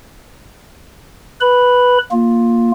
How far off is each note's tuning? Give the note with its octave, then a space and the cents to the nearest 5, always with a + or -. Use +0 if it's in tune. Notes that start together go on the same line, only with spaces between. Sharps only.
B4 +0 B5 +0
A#3 +0 F4 +10